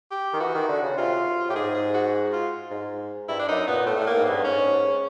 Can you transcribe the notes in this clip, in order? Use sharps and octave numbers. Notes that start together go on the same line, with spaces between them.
G4
D#3
E3 F#4
D#3
D3
C#3
C3 F4
A2 G4
G#2 G#4
G#4
F#4
F4
G#2
G2 E4
D4
F#2 D#4
A#2 B3
A#2
A2 A3
A2 A3
A#3
G#2
G2 B3
G#2 C#4